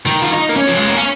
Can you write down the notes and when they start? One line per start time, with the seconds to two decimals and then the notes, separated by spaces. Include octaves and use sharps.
0.06 D#3
0.22 F4
0.32 D#4
0.49 A#3
0.56 C#4
0.67 F3
0.77 G#3
0.87 A#3
0.97 C#4